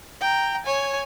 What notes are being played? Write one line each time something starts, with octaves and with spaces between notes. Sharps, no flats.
G5 A#5
C#5 G#5